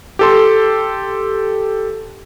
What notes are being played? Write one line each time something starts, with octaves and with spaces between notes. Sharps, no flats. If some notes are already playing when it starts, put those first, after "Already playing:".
G4 A4 C6